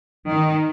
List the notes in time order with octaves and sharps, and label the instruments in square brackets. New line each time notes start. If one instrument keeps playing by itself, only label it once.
[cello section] D#3